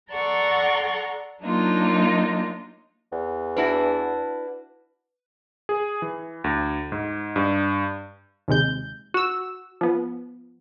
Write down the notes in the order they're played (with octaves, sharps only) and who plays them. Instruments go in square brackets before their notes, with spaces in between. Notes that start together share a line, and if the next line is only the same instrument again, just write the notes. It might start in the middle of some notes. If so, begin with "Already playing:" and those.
[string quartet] A4 D5 F#5 A#5 C6 C#6
F#3 A#3 D4 D#4 F4
[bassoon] E2
[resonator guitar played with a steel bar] D4 E4 F#4 [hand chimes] B4
[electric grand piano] G#4
E3
D2
G#2
G2
[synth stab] D#2 C3 G#3 G6
F#4 E6
F3 B3